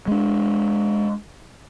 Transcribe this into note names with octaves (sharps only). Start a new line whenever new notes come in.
G#3 D4